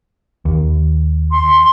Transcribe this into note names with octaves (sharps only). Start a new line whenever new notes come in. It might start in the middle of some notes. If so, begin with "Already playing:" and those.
D#2
C6